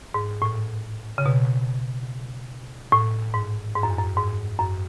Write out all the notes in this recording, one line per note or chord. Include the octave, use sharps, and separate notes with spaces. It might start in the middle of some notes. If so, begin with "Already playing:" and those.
G#2
A2
C#3
B2
A2
G#2
G#2
F#2
E2
F#2
G#2
F#2